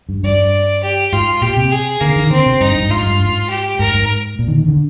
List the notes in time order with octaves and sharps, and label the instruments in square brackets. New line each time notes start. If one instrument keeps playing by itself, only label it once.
[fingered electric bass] G2
[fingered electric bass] G2 [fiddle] D5
[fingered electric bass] G2
[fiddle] G4
[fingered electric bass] G#2 [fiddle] F4
[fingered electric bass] A#2 [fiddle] G4
[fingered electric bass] C3
[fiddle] G#4
[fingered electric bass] D3 [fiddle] A#3
[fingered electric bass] D#3
[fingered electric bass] D3 [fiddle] C4
[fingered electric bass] C3
[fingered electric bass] G2 [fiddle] D#4
[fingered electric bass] G2
[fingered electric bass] G#2 [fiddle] F4
[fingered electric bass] G2
G#2
[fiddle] G4
[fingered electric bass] G#2 [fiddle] A#4
[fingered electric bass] G#2
A#2
D#3
D#3
D3